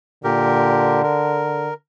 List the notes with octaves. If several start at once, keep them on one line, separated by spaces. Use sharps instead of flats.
A#2 D3 G4 A#4
A#4